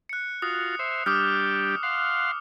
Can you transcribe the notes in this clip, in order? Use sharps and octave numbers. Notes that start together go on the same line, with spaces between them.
F#6 C#7
F4 F#4 D#6
C5 E5
G3 D4 G4 D6 D#6 F6
F5 F#5 C6